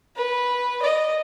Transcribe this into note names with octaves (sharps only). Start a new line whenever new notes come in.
B4
D#5